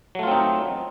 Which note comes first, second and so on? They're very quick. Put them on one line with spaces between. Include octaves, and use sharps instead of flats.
F#3 A3 F4 C4 D#4